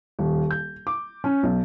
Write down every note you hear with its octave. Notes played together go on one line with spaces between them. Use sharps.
D#1
G6
D6
C#4
B1